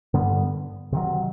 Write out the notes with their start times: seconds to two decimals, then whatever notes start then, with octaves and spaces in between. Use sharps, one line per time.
0.14 G2 D3 G3 B3
0.92 C3 D#3 F#3